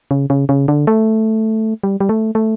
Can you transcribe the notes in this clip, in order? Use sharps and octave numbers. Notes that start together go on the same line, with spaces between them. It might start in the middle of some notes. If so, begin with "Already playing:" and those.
C#3
C#3
C#3
D3
A3
G3
G3
A3
A3